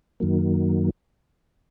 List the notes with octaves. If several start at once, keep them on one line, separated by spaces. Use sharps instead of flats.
F#2 D#3 F#3 A#3